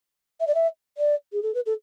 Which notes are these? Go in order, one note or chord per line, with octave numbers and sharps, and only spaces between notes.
E5
D5
E5
D5
G#4
A4
B4
A4